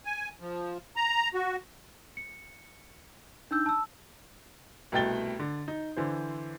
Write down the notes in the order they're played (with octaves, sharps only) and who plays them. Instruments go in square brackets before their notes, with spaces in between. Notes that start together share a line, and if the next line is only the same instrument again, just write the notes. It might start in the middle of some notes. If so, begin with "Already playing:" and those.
[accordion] G#5
F3
A#5
F#4
[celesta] C#7
D4 D#4 E6 G6
A5 E6
[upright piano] C2 B2 A3 G5 A6 G7
D3
D#4
D3 E3 C5